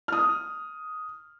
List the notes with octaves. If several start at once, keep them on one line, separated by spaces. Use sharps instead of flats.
D#6 F6